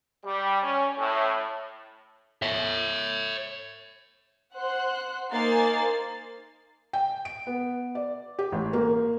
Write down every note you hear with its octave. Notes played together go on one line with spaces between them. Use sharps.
G3
C#4
A2
C#5 E5
C5 F#5 C6 F#6
A#3 D#4 C5 G#5 A6 C7
G5
D7
B3
D5
G4
A1
A#3